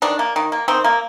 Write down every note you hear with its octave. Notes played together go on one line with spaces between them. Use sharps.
D#3 D4
A#3
D#3
A#3
D#3 C4
A#3